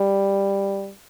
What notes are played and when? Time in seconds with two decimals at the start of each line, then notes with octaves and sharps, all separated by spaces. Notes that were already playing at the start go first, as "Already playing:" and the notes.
Already playing: G3